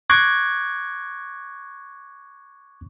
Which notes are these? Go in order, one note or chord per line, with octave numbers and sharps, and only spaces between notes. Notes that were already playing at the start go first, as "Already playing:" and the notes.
C#6 D6 F#6 G#6 A#6 C7